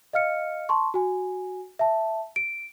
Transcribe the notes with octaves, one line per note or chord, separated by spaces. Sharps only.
D#5 F5 F6 C#7
A5 C6 C#6
F#4 G#5
E5 A5
D7